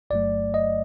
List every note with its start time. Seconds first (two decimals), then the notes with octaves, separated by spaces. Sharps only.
0.10 G1 G2 F#3 A3 D5
0.54 D#5